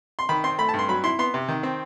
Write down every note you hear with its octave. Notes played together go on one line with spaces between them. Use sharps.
C6
D#3 B5
C4 C6
A3 B5
A5
G2
C6
F#3 B5
E4 C6
B3 C6
C3
D#3
C4